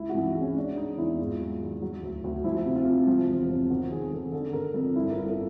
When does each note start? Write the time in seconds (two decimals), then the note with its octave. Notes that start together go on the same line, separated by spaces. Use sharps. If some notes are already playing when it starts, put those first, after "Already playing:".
Already playing: C#2 E4
0.09 F#4
0.15 E3
0.25 E4
0.36 G#3
0.41 C#4
0.56 G#3 D4
0.77 G#3 D#4
0.98 E2 E4
1.19 G#2 F4
1.40 F#3
1.61 D#3
1.82 F#3
2.03 D2
2.24 D2
2.44 F3 E4
2.66 C3
2.76 F4
2.86 C3
3.07 F3
3.28 E1
3.48 F3
3.70 D#3 F#4
3.91 D#3 G#4
4.11 D#3 A4
4.32 D3 A4
4.53 D3 A#4
4.74 F2 A4
4.95 G1 E4
5.10 A#4
5.17 G1
5.27 A4